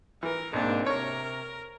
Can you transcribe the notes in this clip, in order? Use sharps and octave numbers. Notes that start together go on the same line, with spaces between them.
E3 A#4
B1 G#2 A#3 C4 D4
C3 A#4 C#5